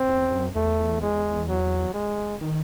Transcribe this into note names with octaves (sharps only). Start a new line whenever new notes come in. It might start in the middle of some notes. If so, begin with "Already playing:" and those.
Already playing: C4
E2
E2
F#2
E2 A3
G#3
F#3
G#3
D#3